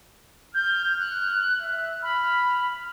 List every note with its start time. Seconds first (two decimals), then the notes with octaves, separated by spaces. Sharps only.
0.54 F6 G6
1.00 F#6
1.61 E5
2.03 B5 F6